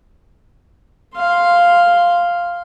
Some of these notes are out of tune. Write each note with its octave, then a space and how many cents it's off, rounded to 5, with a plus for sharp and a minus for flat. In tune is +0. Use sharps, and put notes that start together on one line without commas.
F5 +0 C6 +0